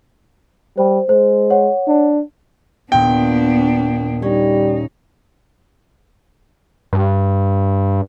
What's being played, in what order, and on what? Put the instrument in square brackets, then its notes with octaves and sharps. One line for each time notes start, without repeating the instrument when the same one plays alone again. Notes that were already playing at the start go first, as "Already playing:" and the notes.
[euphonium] G3 [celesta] C5
[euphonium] G#3 [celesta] C5
[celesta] C#5 F#5
[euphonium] D4
[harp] D#2 A#2 [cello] B3 D4 [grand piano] G5
[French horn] G3 [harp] C#4 [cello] D#4
[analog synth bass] G2